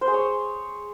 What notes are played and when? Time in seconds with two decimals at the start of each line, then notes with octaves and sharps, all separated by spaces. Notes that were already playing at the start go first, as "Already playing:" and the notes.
0.01 C5
0.08 G#4
0.14 C#5